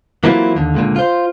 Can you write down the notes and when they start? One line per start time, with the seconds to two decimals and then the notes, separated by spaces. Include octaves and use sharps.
0.24 E3 F#3 A#3 C4 E4 F4
0.56 D#2 D3
0.74 C#2 A#2 D3
0.96 F4 C5